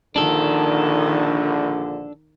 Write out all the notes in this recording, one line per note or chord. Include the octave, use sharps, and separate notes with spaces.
A#1 D3 D#3 D4 A4